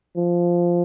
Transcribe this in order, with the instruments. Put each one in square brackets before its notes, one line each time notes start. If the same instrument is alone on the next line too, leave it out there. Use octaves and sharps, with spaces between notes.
[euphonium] F3